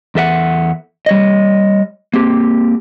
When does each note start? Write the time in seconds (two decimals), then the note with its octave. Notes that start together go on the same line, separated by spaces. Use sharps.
0.15 E2 A4 E5 F#5
1.06 G3 C#5 D#5
2.14 A#3 C4 G4